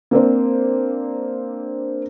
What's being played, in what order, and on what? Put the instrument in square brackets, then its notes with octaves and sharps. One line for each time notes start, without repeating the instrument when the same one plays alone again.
[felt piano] A#3 C4 D4 C5